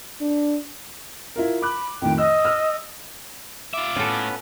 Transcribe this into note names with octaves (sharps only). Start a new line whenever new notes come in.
D4
E4 F4 A#4
B5 D6 F#6
F2 A2 D#3 G5
D#5 E6
E6 F6
F4 E5 D6
A2 B3 C#4 F4 A4 B4